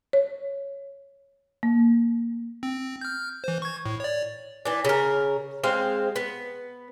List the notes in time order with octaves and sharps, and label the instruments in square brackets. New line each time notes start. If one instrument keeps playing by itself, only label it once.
[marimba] C#5
A#3
[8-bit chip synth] C4
F6 G6
E3 C5
C#6 G#6
A2
C#5 D5
[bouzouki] E3 D4
C#3 A#4
G#3 C4 C5 F5
B3